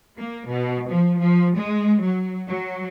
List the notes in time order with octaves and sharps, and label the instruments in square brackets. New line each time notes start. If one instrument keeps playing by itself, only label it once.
[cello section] A#3
B2
F3
F3
G#3
F#3
F#3